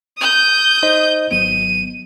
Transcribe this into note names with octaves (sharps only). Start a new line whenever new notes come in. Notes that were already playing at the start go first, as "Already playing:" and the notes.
D#6 G6
D#4 C5 D#5
G#1 F#3 B3 D#7